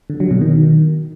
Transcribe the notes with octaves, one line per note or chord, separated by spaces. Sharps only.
D3
F#3
B2
D#3